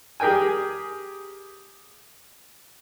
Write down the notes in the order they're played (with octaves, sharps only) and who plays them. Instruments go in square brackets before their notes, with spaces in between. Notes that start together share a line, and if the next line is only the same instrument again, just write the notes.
[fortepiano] G4 G#4 A#4 G5 G#5